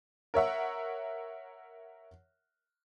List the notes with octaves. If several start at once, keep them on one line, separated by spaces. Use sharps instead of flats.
A#4 C#5 E5 F#5